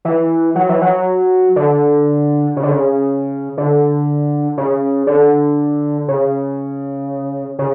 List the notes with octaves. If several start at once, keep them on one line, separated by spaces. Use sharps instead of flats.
E3
F#3
E3
F#3
D3
C#3
D3
C#3
D3
C#3
D3
C#3
C#3